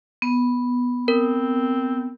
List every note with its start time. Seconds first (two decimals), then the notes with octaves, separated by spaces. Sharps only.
0.22 B3
1.08 C4 A#4